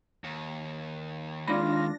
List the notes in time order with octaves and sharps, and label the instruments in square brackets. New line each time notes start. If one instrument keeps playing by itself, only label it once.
[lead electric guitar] D#2
[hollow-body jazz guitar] D#3 G#3 B5 [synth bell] D4 A#6 [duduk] F4